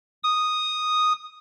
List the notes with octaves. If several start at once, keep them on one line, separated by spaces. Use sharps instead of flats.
D#6